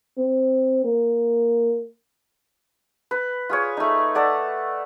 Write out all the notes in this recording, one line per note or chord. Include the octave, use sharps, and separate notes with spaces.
C4
A#3
B4
F4 G#4 C#5
A3 D#4
A4 D5 F#5